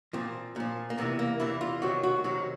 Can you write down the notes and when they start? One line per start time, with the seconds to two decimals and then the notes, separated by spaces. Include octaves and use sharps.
0.13 A#2 F3 C4
0.56 A#2 F3
0.90 A#3
0.98 E2 C3 E3 B3
1.19 A#3
1.40 E2 C3 E3 E4
1.61 F4
1.82 F2 C3 D#3 F#3 F#4
2.03 F#4
2.24 F2 C3 D#3 F#3 F#4